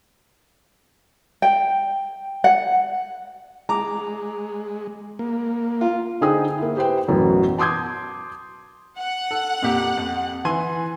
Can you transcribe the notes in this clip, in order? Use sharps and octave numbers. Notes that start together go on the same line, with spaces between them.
G5
F#5
G#3 A#5 D6
A#3
F4
D3 D#4 G#4 C5 G5 D#6
A#3 E4
E4 G4 B4 C5 G5
A1 F#2 B2 E3
A5 C6 D6 D#6 G6 G#6
F#5
A4
F2 A#2 G4
F2
E3 G#5 C6